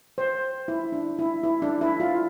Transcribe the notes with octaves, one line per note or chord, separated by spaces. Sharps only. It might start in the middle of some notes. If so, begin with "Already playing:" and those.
C5
E4
D4
E4
E4
D4
E4
F4